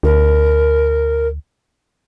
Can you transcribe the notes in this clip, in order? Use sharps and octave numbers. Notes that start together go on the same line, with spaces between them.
D2 A#4